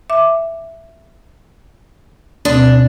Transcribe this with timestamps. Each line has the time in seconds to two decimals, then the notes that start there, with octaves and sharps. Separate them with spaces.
0.10 E5 D6
2.45 D2 B2 C4 D4